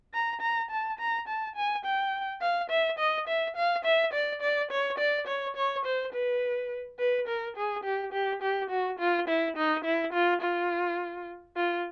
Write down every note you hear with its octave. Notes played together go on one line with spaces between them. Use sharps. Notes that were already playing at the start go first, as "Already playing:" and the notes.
A#5
A#5
A5
A#5
A5
G#5
G5
F5
E5
D#5
E5
F5
E5
D5
D5
C#5
D5
C#5
C#5
C5
B4
B4
A#4
G#4
G4
G4
G4
F#4
F4
E4
D#4
E4
F4
F4
F4